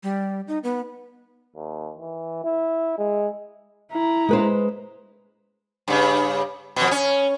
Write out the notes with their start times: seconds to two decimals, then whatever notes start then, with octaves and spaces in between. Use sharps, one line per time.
0.03 G3
0.48 D#4
0.64 B3
1.56 D#2
1.98 E3
2.44 E4
2.98 G#3
3.92 E4 A#5
4.29 G#3 B4 C5
5.88 G2 C#3
6.76 F2 B2
6.91 C#4